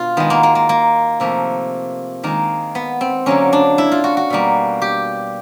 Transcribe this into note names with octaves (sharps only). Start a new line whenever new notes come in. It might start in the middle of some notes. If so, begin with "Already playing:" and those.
Already playing: B2 F4
D#3 G#3 B3
A#3
A#3
A#3
A#3
C3 F3 A3 A#3
D#3 G#3 A#3
B3
C4
D3 F#3 A#3 C#4
D4
E4
F4
F#4
F#4
B2 G3 A#3
G4